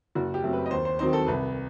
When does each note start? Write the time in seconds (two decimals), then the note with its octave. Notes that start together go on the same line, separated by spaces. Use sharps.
0.15 F#1 F#4
0.34 G4
0.43 F#2 F#3 A3 C4
0.53 B4
0.66 D#5
0.71 D#2 C5
0.85 C5
0.99 D#3 F#3 C4 D#4 C5
1.13 A4
1.27 C2 B4